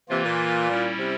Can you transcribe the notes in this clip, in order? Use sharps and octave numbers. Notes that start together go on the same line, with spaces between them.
C3 E3 A#3 F4
A#2
G3 C#4 E4
C3